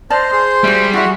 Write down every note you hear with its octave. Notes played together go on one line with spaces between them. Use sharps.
C5 D5 D#5 A5 C6 F6
G#4 C6
G3 F#4 E5
E4 F#4 E5